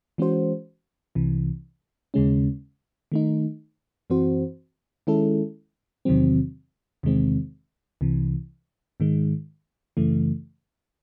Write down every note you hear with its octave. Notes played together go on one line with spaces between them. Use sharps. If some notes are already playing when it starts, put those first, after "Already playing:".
E3 G#3 C#4 F#4 C5
C2 C3 E3
D#2 C#3 G#3 C#4
D#3 A3 D#4
F#2 E3 C4 F#4 C5
D#3 G#3 C#4 E4 A4
E2 C3 D#3 F#3 C4
E2 C3 D#3 G#3 C4
C2 C3 E3
G#2 D#3 G#3
F#2 C#3 E3 A3